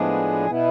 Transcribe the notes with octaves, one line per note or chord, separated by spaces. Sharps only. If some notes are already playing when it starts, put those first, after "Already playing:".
Already playing: A2 F3 G#3 B3 D4 G#4
B2 B3 E4